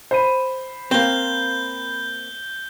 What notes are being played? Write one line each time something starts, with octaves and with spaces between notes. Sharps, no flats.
C5 B5 D#7
A#3 C4 G6 G7